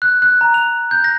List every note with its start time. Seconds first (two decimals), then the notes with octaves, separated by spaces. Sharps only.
0.02 F#6
0.22 F#6
0.41 A#5
0.54 F7
0.91 G6
1.04 A#6